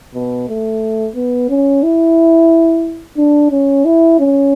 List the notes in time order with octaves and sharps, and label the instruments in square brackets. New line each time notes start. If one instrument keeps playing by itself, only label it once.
[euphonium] B2
A3
B3
C#4
E4
D4
C#4
E4
C#4